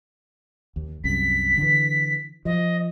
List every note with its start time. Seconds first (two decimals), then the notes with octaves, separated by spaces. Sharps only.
0.76 D#2
1.04 C2 F#2 B6
1.57 D3 E3
2.45 F3 D#5